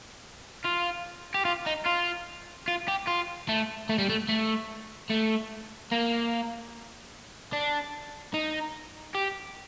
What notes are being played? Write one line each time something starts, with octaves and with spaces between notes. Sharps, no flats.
F4
G4
F4
D#4
F4
F4
G4
F4
A3
A3
G3
A3
A3
A3
A#3
D4
D#4
G4